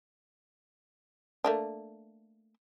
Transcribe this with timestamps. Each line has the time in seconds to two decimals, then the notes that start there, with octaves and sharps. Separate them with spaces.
1.44 A3 A#3 D4